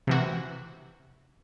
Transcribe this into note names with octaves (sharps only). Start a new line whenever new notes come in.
C3 E3 F#4